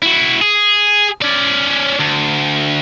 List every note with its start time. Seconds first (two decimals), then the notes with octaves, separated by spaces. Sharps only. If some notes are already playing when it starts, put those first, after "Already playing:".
0.03 E4 F#4
0.41 G#4
1.22 C#4 D5
1.99 D2